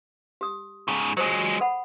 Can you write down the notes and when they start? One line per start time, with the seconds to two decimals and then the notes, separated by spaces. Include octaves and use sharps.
0.41 G4 D#6
0.88 G#2 C#3 G#4 A5
1.17 F#3 G#3 A4 C5 D#6
1.60 A4 F#5 B5